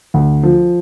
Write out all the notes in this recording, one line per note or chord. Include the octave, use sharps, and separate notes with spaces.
D2
F3